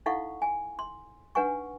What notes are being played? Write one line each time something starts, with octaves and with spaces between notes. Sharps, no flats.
D#4 E4 A4 F5 F#5 C#6
G#5
C6
D4 D#4 B4 F#5 G#5 C#6